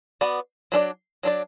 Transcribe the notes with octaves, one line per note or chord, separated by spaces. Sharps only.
B3 F#4 D5
F#3 D4 A4 D5
F#3 D4 A4 D5